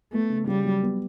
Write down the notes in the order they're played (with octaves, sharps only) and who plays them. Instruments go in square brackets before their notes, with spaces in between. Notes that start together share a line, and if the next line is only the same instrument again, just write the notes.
[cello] A3 [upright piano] B3
[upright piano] C#3
[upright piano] C#3 [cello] G3
[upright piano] F#3
B3